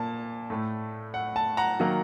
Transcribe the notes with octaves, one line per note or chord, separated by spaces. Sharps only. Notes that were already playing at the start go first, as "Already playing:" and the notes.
Already playing: A#2 A#3 A5
A2 A3
F#5
A5
F#5 A#5
D#3 F#3 A#3